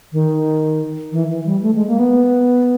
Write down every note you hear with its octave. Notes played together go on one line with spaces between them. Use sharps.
D#3
E3
E3
G3
A3
G#3
A#3
B3